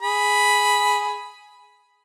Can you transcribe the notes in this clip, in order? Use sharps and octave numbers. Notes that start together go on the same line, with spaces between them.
G#4 B5